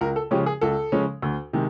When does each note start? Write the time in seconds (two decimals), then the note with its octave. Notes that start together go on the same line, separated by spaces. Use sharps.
0.01 C#2 A#4
0.16 A4
0.31 C#3 F3 G#3 C#4 G4
0.46 G#4
0.61 C#2 A4
0.92 C#3 F3 G#3 C#4
1.22 D2
1.53 C3 D#3 G#3